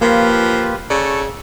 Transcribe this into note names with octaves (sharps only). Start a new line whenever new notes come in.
F3 A#3 F4 G4 B4
C#3 A4 D5 A5 C#6